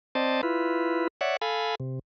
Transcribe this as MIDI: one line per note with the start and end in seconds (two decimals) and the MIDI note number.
0.15 0.41 60
0.15 0.41 72
0.15 0.41 74
0.15 0.41 75
0.15 0.41 81
0.43 1.07 64
0.43 1.07 65
0.43 1.07 71
1.21 1.37 73
1.21 1.37 74
1.21 1.37 76
1.21 1.37 78
1.41 1.75 69
1.41 1.75 77
1.41 1.75 80
1.41 1.75 83
1.80 1.99 48